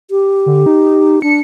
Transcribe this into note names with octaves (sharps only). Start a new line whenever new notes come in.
G4
D3
D#4
D4 C#7